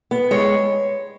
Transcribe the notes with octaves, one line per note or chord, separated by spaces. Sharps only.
B3
G#3 C#5